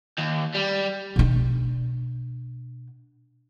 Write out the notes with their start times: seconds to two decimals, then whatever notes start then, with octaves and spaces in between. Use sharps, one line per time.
0.18 D#2
0.54 G3
1.16 B2 D4